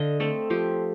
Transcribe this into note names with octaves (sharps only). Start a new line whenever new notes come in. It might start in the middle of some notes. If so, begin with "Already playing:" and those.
Already playing: D3 D#5 F5
A3 C4 A4
F3 G4